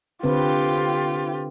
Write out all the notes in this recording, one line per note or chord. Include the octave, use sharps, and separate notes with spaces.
D3 C4 F4 G4 B4